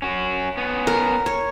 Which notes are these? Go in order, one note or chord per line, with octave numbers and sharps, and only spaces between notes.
C#4 F#4
B3 C#4
A#4
C#5